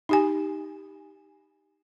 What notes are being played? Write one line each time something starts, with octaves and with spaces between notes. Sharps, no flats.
D#4 G4 G#5